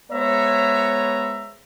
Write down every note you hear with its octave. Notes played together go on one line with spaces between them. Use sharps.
G#3 B3 C5 C#5 E5 A#5